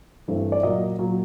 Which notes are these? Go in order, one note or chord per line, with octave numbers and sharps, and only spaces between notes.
G2 E3 A3 C4
D5
A#2 F#3 A#3 D#5
A#2 F#3 A#3